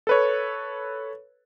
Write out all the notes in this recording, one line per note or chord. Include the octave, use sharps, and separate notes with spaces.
A4 B4 C#5